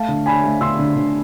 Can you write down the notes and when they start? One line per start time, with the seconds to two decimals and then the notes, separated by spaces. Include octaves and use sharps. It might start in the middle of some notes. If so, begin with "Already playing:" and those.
Already playing: A3 F5 A5
0.08 D3
0.26 D4 G#5 B5
0.44 A3
0.61 D3 C6 E6
0.79 D3
0.96 D3